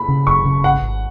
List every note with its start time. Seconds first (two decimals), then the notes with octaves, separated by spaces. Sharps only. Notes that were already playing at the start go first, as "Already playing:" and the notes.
Already playing: B5
0.08 C#3
0.27 F#1 C#6
0.45 C#3
0.64 G#1 F#5
0.82 G#1